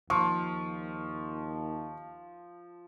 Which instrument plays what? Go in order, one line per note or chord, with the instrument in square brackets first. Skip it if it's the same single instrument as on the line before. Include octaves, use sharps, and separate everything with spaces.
[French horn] D#2 [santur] F3 [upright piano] C#6